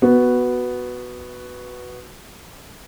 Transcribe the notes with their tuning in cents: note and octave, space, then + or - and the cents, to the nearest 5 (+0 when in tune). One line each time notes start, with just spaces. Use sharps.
B3 +0 F#4 +0